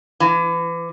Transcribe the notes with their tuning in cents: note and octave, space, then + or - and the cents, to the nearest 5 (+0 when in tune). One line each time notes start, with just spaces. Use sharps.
E3 +35